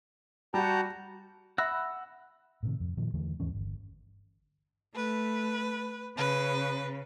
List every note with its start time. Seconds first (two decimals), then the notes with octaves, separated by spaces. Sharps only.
0.54 G3 F#4 G5 A5 A#5
1.58 E5 F#5 B5 E6 A#6
2.63 A2 C3 D#3
2.80 F2
2.97 A#2 D#3 F3
3.14 E2 D3 E3 A3
3.40 D#2 G#2 E3 C#4
3.55 G1
4.95 A3 B4
6.17 C#3 B4